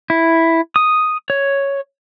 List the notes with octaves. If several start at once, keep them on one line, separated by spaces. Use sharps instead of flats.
E4
D#6
C#5